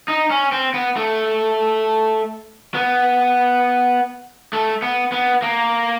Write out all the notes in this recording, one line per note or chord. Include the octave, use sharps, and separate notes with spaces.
D#4
C#4
C4
B3
A3
B3
A3
B3
B3
A#3